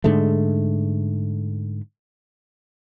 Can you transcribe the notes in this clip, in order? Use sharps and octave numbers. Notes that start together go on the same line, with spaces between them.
G#2 D3 G#3 A3